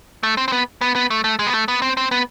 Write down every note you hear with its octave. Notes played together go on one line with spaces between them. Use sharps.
A3
C4
C4
B3
B3
B3
A3
A3
G#3
B3
A3
B3
C4
C4
B3